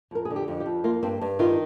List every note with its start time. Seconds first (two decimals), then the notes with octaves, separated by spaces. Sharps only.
0.11 F2 A#4
0.25 G#4
0.30 D3
0.36 G4
0.48 F2
0.60 G4
0.66 F2
0.84 A#3 F4
1.03 G2 C4
1.21 G2
1.39 D#3 F4